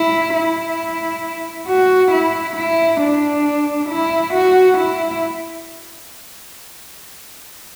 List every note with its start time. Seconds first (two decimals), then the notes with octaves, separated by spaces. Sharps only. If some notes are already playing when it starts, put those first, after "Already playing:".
Already playing: E4
0.35 E4
1.67 F#4
2.11 E4
2.56 E4
3.01 D4
3.89 E4
4.34 F#4
4.78 E4